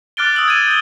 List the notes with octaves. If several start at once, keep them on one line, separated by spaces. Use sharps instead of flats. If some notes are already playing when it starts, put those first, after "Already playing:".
D6 F6 F#6 A6 D7 G7
D#6 E6 F#7
G#6 D#7
G6 G7